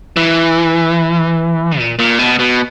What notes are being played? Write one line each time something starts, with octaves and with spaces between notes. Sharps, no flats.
E3
A#2
A#2
B2
B2